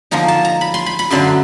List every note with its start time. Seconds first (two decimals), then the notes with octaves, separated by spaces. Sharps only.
0.11 D3 F3 A#3 D#4 A#5
0.28 A5
0.45 A#5
0.61 B5
0.74 C6
0.86 B5
0.99 B5
1.10 F#2 D3 F#3 A3 C6